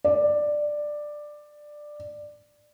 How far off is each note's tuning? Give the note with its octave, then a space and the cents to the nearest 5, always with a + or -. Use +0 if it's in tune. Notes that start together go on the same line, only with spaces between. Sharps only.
D5 +10